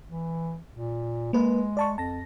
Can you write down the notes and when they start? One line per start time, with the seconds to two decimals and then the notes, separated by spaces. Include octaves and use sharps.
0.08 E3
0.74 A#2
1.33 G#3 A#3 B4
1.77 D5 A5 C#6
1.98 F2 A5 A#6